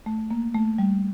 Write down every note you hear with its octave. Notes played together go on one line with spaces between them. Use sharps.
A3
A#3
A3
G3